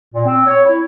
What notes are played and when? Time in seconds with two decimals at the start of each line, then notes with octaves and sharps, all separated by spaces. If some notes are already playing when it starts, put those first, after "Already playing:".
0.14 A#2
0.26 C4
0.47 C#5
0.65 E4